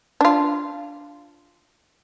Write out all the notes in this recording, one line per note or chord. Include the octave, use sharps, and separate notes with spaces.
D4 F4